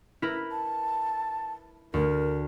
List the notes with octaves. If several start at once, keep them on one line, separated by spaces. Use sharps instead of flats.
E4 A#4 B4
A5
D2 A#4